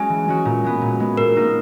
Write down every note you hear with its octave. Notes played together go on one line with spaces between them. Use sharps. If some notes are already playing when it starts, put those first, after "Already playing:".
Already playing: G#3 C#4 F#4 G#5
E3
G#3 C#4 F#4
A#2
G#3 B3
A#2
G#3 B3
A#2 A#4
A#3 D#4 F#4